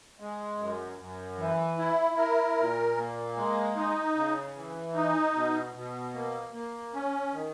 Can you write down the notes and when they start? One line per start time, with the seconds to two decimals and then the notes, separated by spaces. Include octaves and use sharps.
0.20 G#3
0.58 F#2
0.99 F#2
1.38 E3
1.78 E4
2.17 A#4
2.58 A#2
2.97 A#3
3.36 G#3
3.76 D#4
4.15 C#3
4.56 E3
4.94 D#4
5.34 B2
5.74 B2
6.14 A#3
6.53 A#3
6.93 C#4
7.33 D#3